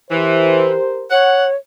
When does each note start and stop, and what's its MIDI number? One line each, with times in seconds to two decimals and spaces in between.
0.11 0.72 52
0.11 1.09 67
0.11 1.09 70
0.11 1.09 72
1.11 1.55 73
1.11 1.45 78